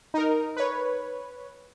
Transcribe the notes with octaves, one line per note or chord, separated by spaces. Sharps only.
D#4 A#4
B4 C#5